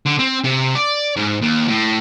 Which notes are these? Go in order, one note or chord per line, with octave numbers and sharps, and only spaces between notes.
D3
C4
C3
D5
G#2
D#2
A2